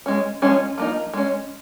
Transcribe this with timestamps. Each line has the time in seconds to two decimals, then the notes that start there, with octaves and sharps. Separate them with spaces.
0.06 G#3 C#4
0.42 F3 G#3 C#4
0.78 F3 A#3 D#4
1.14 G#3 C#4